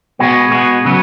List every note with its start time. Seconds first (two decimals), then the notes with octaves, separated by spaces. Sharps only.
0.19 B2 G#3 B3 F#4
0.51 B2 G#3 B3 F#4
0.85 C#3 F#3 B3